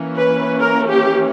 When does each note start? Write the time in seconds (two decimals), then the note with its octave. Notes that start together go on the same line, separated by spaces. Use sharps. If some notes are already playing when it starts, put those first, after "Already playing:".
Already playing: E3 A#3 C#4
0.16 B4
0.60 A#4
0.89 G4